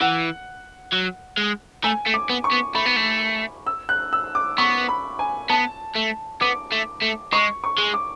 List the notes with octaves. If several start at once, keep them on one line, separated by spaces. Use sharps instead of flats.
E3 F#5
F#3
G#3
A3 G#5
A3
D6
B3
C#6
B3
A3 B5
B3
A3
E6
F#6
E6
D6
B3 C#6
B5
G#5
B3 A5
A3
B3 D6
A3
A3
G#3 C#6
C#6
G#3
D6